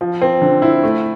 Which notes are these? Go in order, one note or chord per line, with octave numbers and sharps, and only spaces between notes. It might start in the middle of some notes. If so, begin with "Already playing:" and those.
F3
C4
D3
E4
A3